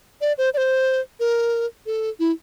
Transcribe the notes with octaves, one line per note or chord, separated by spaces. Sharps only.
D5
C5
D5
C5
A#4
A4
E4